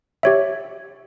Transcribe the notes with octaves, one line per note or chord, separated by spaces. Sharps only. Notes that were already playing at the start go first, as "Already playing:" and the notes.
G4 C#5 E5